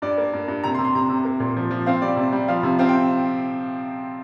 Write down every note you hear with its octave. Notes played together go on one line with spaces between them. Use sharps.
G2 D5
A#3
G2
G2
C3 A#5
C6
C3
C6
C3 A#5
C3
A#3
A#2
F3
F3
C4 F5
G3 D5
C3
G3
F3 F5
C3
C4 F5
G5